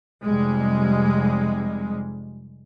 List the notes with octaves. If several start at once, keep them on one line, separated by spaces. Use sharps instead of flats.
F1 C3 G3 G#3